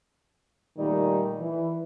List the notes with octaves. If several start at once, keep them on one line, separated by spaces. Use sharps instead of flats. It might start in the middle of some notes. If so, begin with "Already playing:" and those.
A#2 D#3 G3 A3 D#4 D5
E3